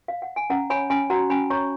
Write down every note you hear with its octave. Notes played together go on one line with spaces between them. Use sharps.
F5
F#5
G#5
C#4 F#5 A#5
C#5 G#5 B5
C#4 G#5 B5
F#4 F#5 A#5
C#4 G#5 B5
C#5 A#5 C#6